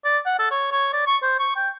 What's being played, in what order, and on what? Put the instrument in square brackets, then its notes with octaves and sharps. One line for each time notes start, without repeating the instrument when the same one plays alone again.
[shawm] D5
F#5
A4
C#5
C#5
D5
C#6
C5
C#6
G5